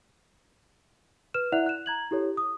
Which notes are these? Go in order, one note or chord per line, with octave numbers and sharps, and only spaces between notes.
B4 F6 E7
E4 D5 E5 F#5 F#6 F7
F#6 E7
A#5 G#6 F#7
E4 G4 A4 C#5
D#6